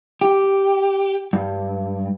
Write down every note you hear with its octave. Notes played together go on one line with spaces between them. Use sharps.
G4
G2